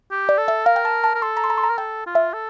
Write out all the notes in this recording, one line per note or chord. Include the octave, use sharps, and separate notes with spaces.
G4
D5
A4
E5
A#4 F5
G5
A5
A5
A#4
A4 C6
A#5
C6
A#5
C6
A#5
A#4
A4 G5
F4
E5
A4